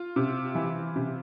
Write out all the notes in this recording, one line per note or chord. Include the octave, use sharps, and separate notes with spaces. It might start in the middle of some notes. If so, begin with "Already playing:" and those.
Already playing: F4
C3
E3
C3